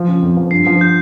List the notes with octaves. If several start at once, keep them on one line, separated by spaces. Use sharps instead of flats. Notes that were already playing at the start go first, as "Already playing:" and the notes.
Already playing: F3
C#3
F2
F3
G2 C7
F3
G6